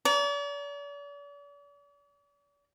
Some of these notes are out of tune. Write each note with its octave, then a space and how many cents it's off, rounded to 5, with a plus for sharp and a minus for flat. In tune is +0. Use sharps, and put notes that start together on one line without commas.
D5 -45 A#5 +0